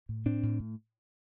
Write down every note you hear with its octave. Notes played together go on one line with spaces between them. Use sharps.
A2
A2 C4 D4
A2
A2